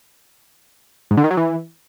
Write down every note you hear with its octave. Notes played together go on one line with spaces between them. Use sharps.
G#2
D3
D#3
F#3
E3